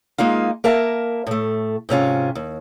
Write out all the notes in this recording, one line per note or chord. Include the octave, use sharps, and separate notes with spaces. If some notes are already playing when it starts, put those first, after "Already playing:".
G#3 A#3 D#4 F4
A#3 A#4 E5 A5
A2 A3
G#2 C3 C#4 F4
D#2